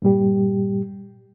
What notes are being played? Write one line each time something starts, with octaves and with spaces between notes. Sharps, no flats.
G2 A#2 G3 G4